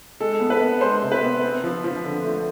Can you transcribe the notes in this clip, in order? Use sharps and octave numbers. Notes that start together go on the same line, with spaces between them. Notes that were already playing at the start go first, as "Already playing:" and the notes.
G#3 A4
B3
B4
B3
G#3 C5
C3
B4
B3
C4
F3
F3
D3
A3